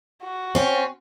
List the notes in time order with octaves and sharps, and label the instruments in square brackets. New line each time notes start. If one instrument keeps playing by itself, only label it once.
[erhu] F#4
[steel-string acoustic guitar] C4 C#4